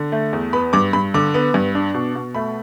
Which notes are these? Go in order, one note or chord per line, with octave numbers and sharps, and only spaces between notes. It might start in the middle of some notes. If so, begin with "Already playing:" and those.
Already playing: D3
A3
E2
B3 B5
G2 D6
G2 B5
D3 D6
B3
G2
D4
B2
B2
A3 B5